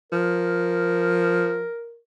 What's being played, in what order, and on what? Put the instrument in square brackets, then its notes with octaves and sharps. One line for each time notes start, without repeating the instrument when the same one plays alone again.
[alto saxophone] F3 [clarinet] A#4